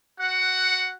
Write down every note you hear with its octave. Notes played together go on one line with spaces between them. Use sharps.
F#4 F#5